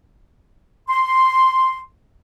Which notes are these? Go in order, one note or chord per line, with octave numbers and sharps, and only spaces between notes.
C6